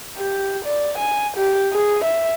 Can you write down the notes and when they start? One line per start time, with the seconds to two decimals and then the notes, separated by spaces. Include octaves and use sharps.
0.17 G4
0.65 D5
0.98 G#5
1.37 G4
1.73 G#4
2.04 E5